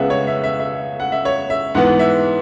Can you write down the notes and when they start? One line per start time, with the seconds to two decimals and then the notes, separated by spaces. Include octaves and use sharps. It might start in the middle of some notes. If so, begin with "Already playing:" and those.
Already playing: C#2 C#3 G#3 B3 E5 F#5
0.10 C#5
0.27 E5
0.44 E5
0.59 E5
1.00 F#5
1.12 E5
1.25 C#5
1.50 E5
1.75 G#2 E3 B3 F#5
1.99 E5